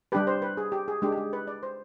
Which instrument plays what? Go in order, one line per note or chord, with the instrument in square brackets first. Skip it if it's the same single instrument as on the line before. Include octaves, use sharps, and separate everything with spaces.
[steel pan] G3 D4 G4 B4
C5
B4
G#4
G4
G#4
G#3 D4 G4
G4
G#4
B4
D5
C5